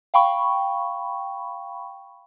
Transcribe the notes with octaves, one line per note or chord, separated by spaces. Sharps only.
F5 G5 B5 C#6